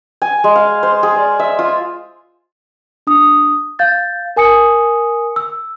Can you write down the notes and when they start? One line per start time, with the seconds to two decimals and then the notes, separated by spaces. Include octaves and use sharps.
0.22 G#5
0.44 G#3
0.56 F5
0.83 C5
1.03 G#4
1.16 D5
1.39 E5
1.59 F4
3.07 D4 D#6
3.79 F5 G6 A6
4.36 A#4 G#5 D#6 C#7
5.36 E6